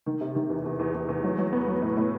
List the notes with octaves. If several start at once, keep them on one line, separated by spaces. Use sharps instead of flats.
D#3
C3
D#3
E2
E2
E2
E2
E2
F#3
F#3
B3
F#3
A2
A2